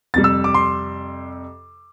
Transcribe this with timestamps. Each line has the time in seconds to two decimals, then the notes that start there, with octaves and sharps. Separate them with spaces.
0.14 F2 C3 G3 A6
0.24 E6
0.44 D6
0.54 C6